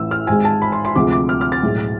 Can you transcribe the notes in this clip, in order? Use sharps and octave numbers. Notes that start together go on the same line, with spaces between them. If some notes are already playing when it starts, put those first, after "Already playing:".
Already playing: A1 A2 E3 E6
F6
G#1 G#2 G#3 G#5
A5
B5
C6
C6
D2 C3 F3 G#3 D6
D6
F6
F6
A6
B1 A2 G#3